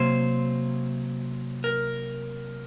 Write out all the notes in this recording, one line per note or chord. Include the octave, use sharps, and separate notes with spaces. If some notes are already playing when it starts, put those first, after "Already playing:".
Already playing: C3 F#3 A#3 C5
A#4